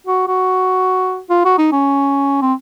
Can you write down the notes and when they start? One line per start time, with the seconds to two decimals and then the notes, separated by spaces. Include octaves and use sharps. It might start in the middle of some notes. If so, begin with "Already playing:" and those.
0.07 F#4
0.27 F#4
1.30 F4
1.45 F#4
1.58 D#4
1.72 C#4
2.41 C4